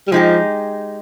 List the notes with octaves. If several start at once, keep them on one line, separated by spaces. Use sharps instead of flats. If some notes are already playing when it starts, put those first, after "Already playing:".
G3
F3 G#3 D#4 G4